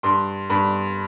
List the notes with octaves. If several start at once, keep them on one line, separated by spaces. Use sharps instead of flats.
G2 C6
G2 B5